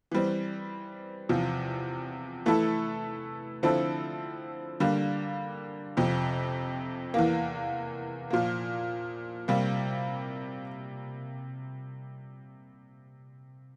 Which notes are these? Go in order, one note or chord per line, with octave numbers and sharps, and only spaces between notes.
E3 G3 C4
E2 C3 F3
E3 A3 E4 A4
D3 F3 C4 E4 A4
D3 G3 A#3
F2 C3 F3
E2 E3 A#3
A#2 F3 A#3
C3 G3 A#3